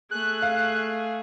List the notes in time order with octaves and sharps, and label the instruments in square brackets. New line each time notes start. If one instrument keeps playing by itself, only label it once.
[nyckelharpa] A3 G#4 [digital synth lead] F#6
[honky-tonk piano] F5